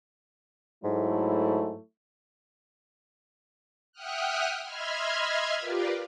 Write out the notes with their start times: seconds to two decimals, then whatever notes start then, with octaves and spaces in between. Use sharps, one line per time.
0.84 G#2 F#3 A3 E4
3.92 E5 F#5 G5 D#6 F6 F#6
4.62 D#5 E5 B5 C6 F6 G#6
5.59 F4 G4 A#4 B4 D5 F5